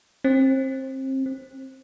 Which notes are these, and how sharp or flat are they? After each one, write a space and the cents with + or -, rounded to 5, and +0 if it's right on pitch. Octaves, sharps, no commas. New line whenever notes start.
C4 +30
C4 +15